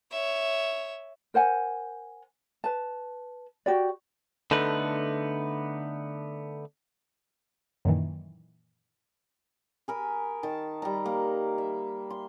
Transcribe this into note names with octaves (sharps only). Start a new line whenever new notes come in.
C#5 E5
A#4 C5 F#5 G#5
B4 A5
F#4 G4 D5
D3 A3 B3 D#4 B4
F#2 A#2 D#3 E3
G#4 A#4 B5
D#3 A5
G3 A#5
A#3
E5
C6